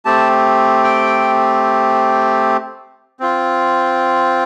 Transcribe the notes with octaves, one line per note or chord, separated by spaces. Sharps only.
A3 C4 G4 A5
G5
C4 F4